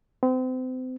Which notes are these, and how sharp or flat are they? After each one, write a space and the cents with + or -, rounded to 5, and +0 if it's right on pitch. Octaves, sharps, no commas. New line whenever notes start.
C4 -35